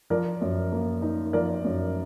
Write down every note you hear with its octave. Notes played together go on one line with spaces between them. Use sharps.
F3 A#4 D5
F#2
A#3
D#4
F3 A#4 D5
F#2